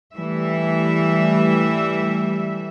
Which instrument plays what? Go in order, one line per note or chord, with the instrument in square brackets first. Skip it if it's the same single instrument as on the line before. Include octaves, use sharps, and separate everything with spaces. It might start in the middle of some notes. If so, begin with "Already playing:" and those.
[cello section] E3 G3 A3 E5